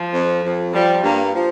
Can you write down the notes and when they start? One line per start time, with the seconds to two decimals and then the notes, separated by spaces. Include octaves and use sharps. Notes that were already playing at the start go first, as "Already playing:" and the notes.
Already playing: F3
0.14 F2
0.44 F2
0.74 F3 G3
1.04 G2 A#3
1.34 F3